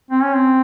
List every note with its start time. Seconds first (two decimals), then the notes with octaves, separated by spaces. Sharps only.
0.11 C4
0.23 C#4
0.34 C4